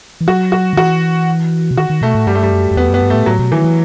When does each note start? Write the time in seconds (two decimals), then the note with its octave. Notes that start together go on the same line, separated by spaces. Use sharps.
0.21 E3
0.27 F#3 F#4
0.52 F#4
0.73 D#3
0.77 E3 F#4
1.71 C3
1.77 D#3 F#4
1.90 D#3
2.02 B2 A3
2.15 A2
2.27 G2 G3
2.35 A3
2.43 G3
2.51 F#2
2.71 F#2
2.77 E2 B3
2.89 F#2
2.94 B3
3.02 G2
3.10 A3
3.14 A2
3.26 A2 F#3
3.39 B2
3.52 D#3 E3
3.64 E3